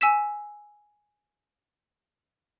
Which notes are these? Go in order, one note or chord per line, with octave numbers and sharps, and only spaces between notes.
G#5 E6 B6 E7